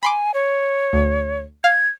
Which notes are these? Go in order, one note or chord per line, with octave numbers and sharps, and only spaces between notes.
G#5 B5 C6 D6
C#5
D2
F5 G#6